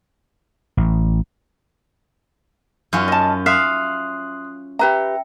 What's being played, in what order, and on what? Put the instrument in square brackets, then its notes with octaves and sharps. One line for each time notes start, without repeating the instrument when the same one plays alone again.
[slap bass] A1
[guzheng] F#2 C#4 F4
[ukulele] D#5 A5
[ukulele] E5 [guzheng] F5 [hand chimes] C6 D#6 F#6
[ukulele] G4 B4 A#5 [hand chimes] E5 G5